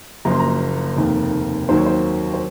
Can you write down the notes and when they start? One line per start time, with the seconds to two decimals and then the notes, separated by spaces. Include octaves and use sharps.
0.25 F#1 F#2 F3 A#3 A#5
0.32 C6
0.40 A#5
0.97 F1 D#2 D#3 A#3
1.69 D#2 D#3 F#3 A#3 C5
1.77 C#5
1.86 C5
2.34 C5